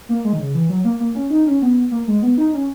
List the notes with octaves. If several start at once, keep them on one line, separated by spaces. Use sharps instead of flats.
A#3
G#3
D#3
C#3
E3
F#3
A#3
A#3
C#4
D#4
C#4
B3
A#3
G#3
B3
D#4
C#4